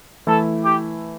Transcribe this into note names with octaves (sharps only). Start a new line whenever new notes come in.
E3 A3 E4 A4
G4